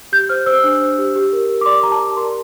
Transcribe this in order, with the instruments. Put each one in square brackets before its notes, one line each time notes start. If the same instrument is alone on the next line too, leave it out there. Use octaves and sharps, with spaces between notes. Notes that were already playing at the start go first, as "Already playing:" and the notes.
[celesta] G4 G6
C5 F6
C5 E6
D4
C5
G4
G4
A#4
A#4
D6
D5 C6
G4 A#5
A5
G4
A#4 C6